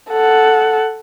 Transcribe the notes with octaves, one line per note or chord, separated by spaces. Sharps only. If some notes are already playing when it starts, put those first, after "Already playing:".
A4 F#5